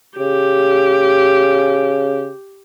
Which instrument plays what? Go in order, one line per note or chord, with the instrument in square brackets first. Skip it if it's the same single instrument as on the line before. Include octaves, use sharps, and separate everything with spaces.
[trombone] C#3 [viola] G4